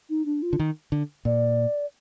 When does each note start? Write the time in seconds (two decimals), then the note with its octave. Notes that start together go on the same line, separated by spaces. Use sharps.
0.10 D#4
0.26 D4
0.42 F4
0.53 D3
0.60 D#3
0.92 D3
1.25 A#2 D5